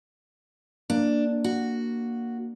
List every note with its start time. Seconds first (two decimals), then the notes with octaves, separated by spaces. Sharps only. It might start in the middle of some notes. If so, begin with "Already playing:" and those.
0.90 A#3 D4
1.44 F#4